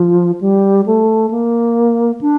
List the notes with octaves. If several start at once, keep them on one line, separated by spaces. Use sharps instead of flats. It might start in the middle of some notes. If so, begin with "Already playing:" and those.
Already playing: F3
G3
A3
A#3
D4